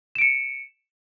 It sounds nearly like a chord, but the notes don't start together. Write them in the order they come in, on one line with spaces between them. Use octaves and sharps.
E7 D7 C#7